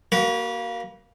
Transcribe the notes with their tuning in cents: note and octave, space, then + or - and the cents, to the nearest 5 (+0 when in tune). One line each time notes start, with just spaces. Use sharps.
A#3 +0 F#4 +35 B4 -25